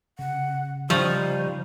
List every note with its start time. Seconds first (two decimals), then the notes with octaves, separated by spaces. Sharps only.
0.19 C#3 F#5
0.90 F3 G3 D#4 C5 C#6